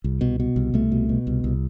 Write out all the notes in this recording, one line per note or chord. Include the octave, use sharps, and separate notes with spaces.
C2
B2
B2
C2
C2 A3
B2
B2
C2
C2